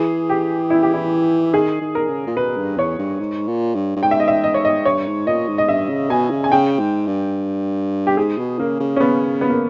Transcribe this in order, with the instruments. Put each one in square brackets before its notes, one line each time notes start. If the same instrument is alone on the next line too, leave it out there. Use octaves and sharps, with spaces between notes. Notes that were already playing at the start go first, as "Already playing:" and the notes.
Already playing: [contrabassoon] E3 [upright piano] G#4
[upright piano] G4
E4
G4
E4
[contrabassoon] D#3 [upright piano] G#4
[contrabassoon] D#3
[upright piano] A#4
[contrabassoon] C#3
A#2
[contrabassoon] B2 [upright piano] B4
[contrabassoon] G2
[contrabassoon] E2 [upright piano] C#5
[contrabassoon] G2
G#2
A#2
G2
G2
[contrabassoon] G#2 [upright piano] G5
[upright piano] E5
D#5
E5
D#5
C#5
D#5
[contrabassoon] G2 [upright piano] C#5
[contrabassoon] G#2
[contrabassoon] A#2 [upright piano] D#5
[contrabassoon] G#2
[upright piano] D#5
[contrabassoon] G2 [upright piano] E5
[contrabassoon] C#3
[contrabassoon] B2 [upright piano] G#5
[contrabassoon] C#3
[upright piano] G#5
[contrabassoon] C#3 [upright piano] G5
[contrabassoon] G#2
G2
[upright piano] G4
[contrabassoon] G#2 [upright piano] G#4
[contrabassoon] B2
[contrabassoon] C#3 [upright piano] A#3
[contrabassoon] C#3
[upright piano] C#4
[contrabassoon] C#3 [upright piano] B3
[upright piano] B3
A#3